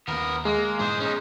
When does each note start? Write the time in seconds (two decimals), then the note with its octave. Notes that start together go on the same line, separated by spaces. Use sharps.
0.08 D#2 B3 A#4
0.45 G#3 A#3
0.79 G#2 B2 E3 G#4 C5
1.00 C#4 D#4